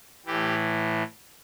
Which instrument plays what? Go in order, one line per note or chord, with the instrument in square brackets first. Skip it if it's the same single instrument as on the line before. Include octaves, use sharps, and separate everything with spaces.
[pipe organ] A2 E3 G4